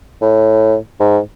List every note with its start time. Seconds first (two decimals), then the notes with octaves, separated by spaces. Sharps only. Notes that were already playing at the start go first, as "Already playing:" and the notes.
0.22 A2
1.00 G#2